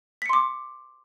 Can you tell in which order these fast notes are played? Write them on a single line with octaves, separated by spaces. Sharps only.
B6 C#7 C6 D6